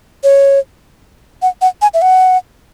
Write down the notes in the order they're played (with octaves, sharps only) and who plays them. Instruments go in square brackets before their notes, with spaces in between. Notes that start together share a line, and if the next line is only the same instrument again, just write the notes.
[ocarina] C#5
F#5
F#5
G#5
E5
F#5